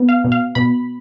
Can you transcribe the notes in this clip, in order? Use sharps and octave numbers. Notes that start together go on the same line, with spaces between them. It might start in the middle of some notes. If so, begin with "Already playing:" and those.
Already playing: B3
F5
B2
F5
B2 B5